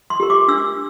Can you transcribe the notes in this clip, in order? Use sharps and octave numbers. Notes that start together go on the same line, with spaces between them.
C6
G4 A#4
D6
D4 E6